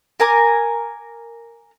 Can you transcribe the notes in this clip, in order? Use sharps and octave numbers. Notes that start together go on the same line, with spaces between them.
A#4 G#5 A#5 D6